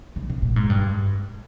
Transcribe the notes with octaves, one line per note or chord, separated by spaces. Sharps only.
C#3
C3
A#2
G#2
G2